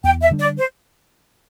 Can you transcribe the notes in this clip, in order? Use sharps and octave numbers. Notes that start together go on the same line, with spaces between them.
E2 G5
E5
D3 G3 D4
D5
C5